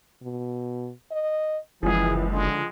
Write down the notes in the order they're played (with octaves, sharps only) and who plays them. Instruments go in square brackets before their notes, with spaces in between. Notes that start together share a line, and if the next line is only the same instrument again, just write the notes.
[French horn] B2
D#5
[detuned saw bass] F#1 [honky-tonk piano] C#2 F3 [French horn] E3 [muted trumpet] G#4
[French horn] D3 [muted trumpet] G#3